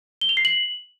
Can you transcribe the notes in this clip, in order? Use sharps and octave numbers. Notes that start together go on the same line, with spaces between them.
G7
F7
C7
F#7